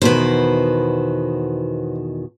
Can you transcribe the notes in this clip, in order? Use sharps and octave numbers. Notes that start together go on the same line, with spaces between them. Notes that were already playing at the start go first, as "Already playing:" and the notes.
E2 B2 D#3 B4 C5